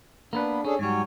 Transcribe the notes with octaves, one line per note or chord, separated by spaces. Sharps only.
A#3 B3 D4 B4
C#4 D4 G#4 A4
G#2 F#3 G3 C#5 G#5